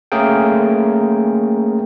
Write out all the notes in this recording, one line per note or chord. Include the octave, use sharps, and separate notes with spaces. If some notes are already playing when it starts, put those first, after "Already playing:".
A3 A#3 C#4 G#4 A#4 G5